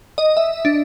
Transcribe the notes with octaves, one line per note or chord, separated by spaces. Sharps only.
D#5
E5
D4